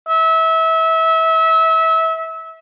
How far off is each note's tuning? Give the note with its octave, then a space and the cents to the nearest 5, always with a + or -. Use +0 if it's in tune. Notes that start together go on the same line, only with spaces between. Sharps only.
E5 -25